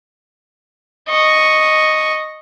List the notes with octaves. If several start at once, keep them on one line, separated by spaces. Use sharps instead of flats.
D#5 C#6